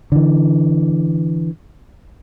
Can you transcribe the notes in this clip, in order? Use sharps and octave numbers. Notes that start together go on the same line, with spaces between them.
D3 E3